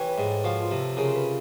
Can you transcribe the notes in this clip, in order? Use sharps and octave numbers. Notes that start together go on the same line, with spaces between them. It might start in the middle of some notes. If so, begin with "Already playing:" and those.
Already playing: E3 G4 C#5
B4
G#2
A4
F3 F#4
F4
C3
A4
C#3 A#4
C5
B4